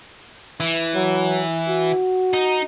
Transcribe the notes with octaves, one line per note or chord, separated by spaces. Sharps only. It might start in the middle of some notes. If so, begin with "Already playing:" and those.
E3
F#3
F#4
D#4